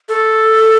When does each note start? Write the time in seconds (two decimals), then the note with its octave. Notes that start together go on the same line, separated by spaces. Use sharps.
0.09 A4